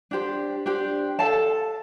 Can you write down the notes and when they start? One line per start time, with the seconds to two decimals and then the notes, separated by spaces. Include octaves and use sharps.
0.11 D4 G4 C5
0.66 D4 G4 C5
1.19 A4 F5 A5